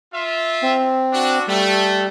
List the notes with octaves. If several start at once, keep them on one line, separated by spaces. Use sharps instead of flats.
F4 E5
C4
D4 F#4
G3 A3